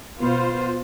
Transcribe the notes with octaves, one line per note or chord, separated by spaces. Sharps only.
B2 B3 F4 C5